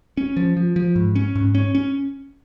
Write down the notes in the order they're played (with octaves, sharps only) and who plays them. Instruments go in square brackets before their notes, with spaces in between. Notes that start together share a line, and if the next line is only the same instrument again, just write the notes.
[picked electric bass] C#4
F3
F3
F3
G#2
C#4
G#2
C#4
C#4